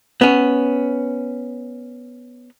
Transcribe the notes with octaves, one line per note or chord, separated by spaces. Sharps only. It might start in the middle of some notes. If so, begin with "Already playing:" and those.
B3 C#4